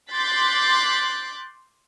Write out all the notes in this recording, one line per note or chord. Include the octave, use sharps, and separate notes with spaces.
C6 D6 F#6 G6 A6 B6